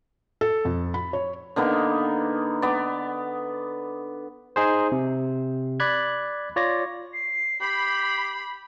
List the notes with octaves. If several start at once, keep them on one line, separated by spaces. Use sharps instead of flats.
A4
F2
B5
C#5
D3 A#3 B3 D#4
B3 D5
D#4 G#4 C5
C3
D5 B5 F#6 G#6
F4 C#5 D5 A#6
C7
G4 B5